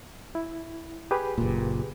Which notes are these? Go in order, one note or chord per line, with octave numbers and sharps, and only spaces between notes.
E4
G4 G#4 B4
F#1 A#2